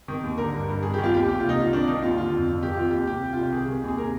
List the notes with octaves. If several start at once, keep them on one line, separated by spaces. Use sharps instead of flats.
D#3
D#2
D3 A#4
G2
G2
D#3 G#4
D#3 G4
F4
D#2 G4
A#2 G4
C2 F4
D#4
C2 F4
D#3 D4
D#3 D#4
D#2 F4
D3 F4
F2
F2
D#3 G4
D#3 F4
D#2 G4
C3 G4
C2
C2 F4
G4
D#3 G#4
D#3
D#2
G#4
C3 A#4